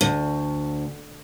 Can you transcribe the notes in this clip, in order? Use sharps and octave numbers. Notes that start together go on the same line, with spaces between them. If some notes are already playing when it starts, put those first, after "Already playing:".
D2